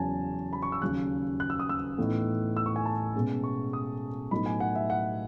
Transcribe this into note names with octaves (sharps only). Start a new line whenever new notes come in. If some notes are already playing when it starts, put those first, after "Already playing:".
Already playing: E2 C#3 F#3 C#4 G#5 A5
B5
C#6
E6
D#2 C#3 F#3 C#4 F#6
F#6
E6
D#6
E6
A2 E3 B3 D#4
E6
C#6
G#5
A5
B2 G#3 C#4
C#6
D#6
A2 F#3 B3 D#4 B5
G#5
F#5
E5
F#5